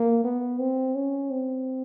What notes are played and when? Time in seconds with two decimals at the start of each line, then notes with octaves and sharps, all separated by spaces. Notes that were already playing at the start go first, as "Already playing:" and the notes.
Already playing: A#3
0.24 B3
0.59 C4
0.95 C#4
1.30 C4